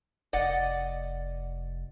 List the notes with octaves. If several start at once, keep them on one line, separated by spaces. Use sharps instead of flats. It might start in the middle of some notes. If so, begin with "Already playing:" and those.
F1 D5 D#5 F#5